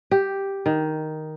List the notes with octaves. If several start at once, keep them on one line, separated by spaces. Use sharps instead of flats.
G4
D#3